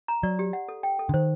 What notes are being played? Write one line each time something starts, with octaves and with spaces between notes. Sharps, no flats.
A#5
F#3 D5
G4
F#5
A4
G5
A4
D3
D#3 C5